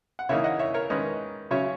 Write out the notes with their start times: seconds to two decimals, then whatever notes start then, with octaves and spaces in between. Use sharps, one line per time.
0.19 F#5
0.29 C#3 E3 A#3 D#4 C#5 E5
0.44 D#5 F#5
0.59 C#5 E5
0.74 A#4 C#5
0.90 D#3 G#3 C#4 B4 D#5
1.51 C#3 F#3 C#4 C#5 E5